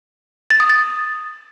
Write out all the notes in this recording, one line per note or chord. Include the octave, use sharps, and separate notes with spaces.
A6
D#6
A6